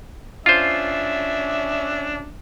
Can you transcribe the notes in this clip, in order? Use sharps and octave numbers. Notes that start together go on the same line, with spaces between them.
C#4 D4 F4 C5 E5